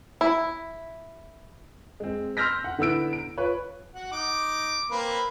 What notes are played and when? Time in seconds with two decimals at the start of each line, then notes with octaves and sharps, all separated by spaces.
0.21 E4
2.00 G#3 C4
2.37 C6 E6 F6 G6 A#6 B6
2.64 F#5
2.79 D3 B3 E4 E6 D7
3.13 D7
3.38 F4 B4 C#5
3.95 F#4 F#5
4.12 D#4 D6
4.91 A#3 C4 B4